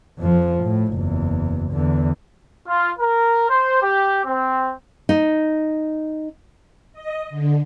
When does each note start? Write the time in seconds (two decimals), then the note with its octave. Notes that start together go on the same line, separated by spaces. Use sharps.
0.18 F2 F3
0.64 A2
0.93 F#1 E2
1.72 E2 D3
2.67 F4
2.99 A#4
3.50 C5
3.82 G4
4.25 C4
5.09 D#4
6.93 D#5
7.30 D3